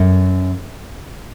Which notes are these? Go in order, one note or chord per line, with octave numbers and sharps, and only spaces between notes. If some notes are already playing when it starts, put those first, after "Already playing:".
Already playing: F#2